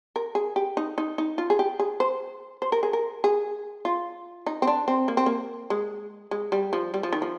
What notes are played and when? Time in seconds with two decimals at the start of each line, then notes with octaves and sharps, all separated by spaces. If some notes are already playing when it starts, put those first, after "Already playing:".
0.16 A#4
0.35 G#4
0.56 G4
0.77 D#4
0.98 D#4
1.18 D#4
1.38 F4
1.50 G#4
1.59 G4
1.79 G#4
2.00 C5
2.62 C5
2.72 A#4
2.83 G#4
2.93 A#4
3.24 G#4
3.85 F4
4.46 D#4
4.62 C4
4.67 D4
4.88 C4
5.08 A#3
5.17 C4
5.26 A#3
5.70 G#3
6.31 G#3
6.52 G3
6.73 F3
6.94 G3
7.03 F3
7.13 D#3
7.22 F3